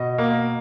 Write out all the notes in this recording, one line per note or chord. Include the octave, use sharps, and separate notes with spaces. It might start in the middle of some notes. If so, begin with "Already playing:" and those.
Already playing: B2 D#5
A#3